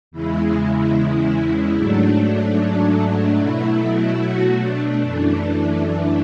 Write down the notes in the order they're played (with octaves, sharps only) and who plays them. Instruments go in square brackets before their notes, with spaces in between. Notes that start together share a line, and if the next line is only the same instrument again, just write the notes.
[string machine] E2 C#3 G#3 E4
G#2 F#3 A3 D4
B2 F#3 A3 E4
F#3 F#4
D4
F#2 E3 A3